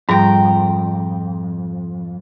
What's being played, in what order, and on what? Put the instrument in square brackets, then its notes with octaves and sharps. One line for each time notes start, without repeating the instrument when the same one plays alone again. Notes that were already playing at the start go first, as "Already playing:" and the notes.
[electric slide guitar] F2 [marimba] G#2 G3 [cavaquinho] G5 A#5